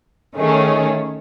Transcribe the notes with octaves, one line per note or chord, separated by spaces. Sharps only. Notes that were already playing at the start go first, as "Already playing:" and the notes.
D#3 A3 C#4 G#4